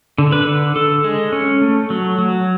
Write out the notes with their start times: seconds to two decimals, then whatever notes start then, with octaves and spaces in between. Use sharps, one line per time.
0.18 D3
0.32 B4
0.47 D3
0.76 D3 A4
1.04 G#3
1.32 C#4
1.61 A3
1.90 F#3
2.18 F#3